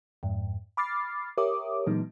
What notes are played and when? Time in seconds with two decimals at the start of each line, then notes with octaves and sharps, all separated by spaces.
0.23 F2 G#2
0.77 B5 D6 F6 A6 C7
1.38 G4 A#4 C#5 E5 D6 D#6
1.86 A#2 E3 F#3 G#3 B3 D#4